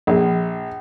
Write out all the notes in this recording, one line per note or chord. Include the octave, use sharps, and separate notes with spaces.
A#1